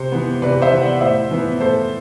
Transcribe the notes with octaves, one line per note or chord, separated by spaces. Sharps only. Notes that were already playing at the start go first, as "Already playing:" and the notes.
Already playing: C3 C5
E3 B3
C3 B4 D5
C5 E5
E3 B3
D5 F#5
A2 C5 E5
E3 B3
A2 A4 C5